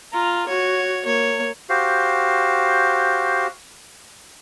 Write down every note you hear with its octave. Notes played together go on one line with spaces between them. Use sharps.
F4 A#5
F#4 C#5
A#3 C#5
F#4 G4 C5 F5